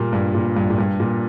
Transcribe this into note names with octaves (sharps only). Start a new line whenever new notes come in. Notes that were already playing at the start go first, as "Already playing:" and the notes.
Already playing: A#2 G3 A#3
G2
A#2
G2
A#2
G2
A#2